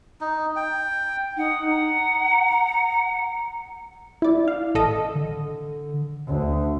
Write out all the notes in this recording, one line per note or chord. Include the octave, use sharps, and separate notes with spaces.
D#4
G5
D#4 F#5
A#5
E4 D5
F5
A1 A4 D#5
D3
D2